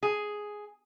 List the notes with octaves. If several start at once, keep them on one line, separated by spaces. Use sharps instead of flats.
G#4